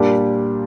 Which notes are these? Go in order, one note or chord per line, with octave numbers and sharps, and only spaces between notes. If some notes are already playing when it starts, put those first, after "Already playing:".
Already playing: A#2 G3 D4 G4 A#4